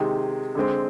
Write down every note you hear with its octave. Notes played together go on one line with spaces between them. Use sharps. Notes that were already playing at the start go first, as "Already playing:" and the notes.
Already playing: C3 D#3 G#3
D3 G#3 C4